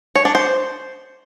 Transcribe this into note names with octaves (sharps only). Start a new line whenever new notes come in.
C#5
D4
C5